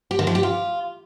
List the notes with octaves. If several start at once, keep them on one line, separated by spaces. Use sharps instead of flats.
G4
D#3
F3
G4
F4